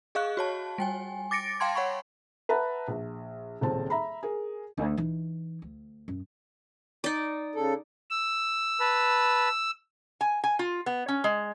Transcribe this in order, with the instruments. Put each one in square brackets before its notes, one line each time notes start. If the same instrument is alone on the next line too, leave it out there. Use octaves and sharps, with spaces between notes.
[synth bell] G#4 D#5 F5 C#6 F#6
F#4 C#5 A5
G3 G5 G#5
D6 A6 A#6 C#7 D7
F5 G5 A5 C6 G#6
C#5 F#5 B5 C#6
[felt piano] B4 E5 F#5 A5 A#5
A#1
D#1 C#2 C4 A5
E5 A#5 B5
G#4 A#4
[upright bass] D2
E3 D#4
D2
F#2
[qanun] D#4 D5
[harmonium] C#3 A4
[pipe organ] E6
[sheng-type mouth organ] B4 A5 B5
[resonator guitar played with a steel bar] G#5
G#5
F4
B3
C#4
G#3